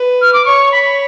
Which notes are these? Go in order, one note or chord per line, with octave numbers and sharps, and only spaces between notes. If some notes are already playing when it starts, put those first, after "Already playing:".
Already playing: B4
F6
D6
C#5 C#6
B5